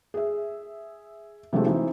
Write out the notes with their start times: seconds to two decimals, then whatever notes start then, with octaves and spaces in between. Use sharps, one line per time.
0.14 G#4 E5
1.53 C3 E3 F#3 G#3 A3 C4
1.66 E3 C4 D#4